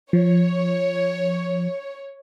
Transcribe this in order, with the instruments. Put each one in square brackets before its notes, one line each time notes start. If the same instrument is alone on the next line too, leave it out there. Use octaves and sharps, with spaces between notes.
[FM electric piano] F3 [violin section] C#5